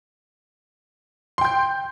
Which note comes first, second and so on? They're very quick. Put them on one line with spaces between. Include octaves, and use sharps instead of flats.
C6 G5 G6